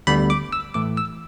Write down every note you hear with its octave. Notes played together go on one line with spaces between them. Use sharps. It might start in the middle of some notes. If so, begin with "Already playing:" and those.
D2 D3 G3 B3 B5
D6
E6
A2 E3 A3 D6
E6